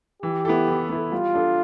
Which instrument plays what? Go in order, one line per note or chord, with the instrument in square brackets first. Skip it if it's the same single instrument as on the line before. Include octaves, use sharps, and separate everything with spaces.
[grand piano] E3 [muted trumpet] G4
[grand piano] B3 E4 A4
E3
B3 E4 A4
[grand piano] G3 [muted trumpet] F4
[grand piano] D4 A4